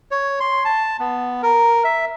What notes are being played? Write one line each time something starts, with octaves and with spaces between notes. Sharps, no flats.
C#5
C6
A5
B3
A#4
E5